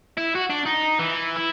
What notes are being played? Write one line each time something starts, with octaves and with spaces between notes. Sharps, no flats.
E4
F#4
D4
D#4
E3
E4